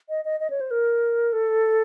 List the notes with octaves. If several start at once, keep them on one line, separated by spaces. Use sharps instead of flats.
D#5
D#5
D#5
C#5
C5
A#4
A4